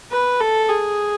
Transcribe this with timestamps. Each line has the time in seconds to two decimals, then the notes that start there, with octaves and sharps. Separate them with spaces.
0.11 B4
0.40 A4
0.69 G#4